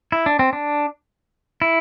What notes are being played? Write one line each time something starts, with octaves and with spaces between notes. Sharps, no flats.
E4
D4
C4
D4
E4